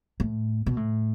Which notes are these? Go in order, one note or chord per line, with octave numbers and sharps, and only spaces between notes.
A2
B2
A2